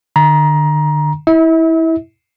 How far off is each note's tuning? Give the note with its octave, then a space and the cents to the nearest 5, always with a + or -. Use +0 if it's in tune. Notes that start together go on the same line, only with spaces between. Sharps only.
D3 +40 A#5 +20
E4 -15 E5 -40